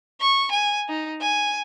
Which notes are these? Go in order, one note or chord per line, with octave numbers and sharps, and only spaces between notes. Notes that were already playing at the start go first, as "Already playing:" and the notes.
C#6
G#5
D#4
G#5